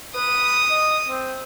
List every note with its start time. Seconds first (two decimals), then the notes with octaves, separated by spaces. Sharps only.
0.15 B4 D#6
0.70 D#5
1.09 C4